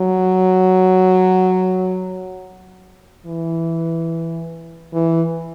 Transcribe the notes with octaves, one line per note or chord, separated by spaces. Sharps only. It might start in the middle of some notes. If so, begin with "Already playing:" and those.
Already playing: F#3
E3
E3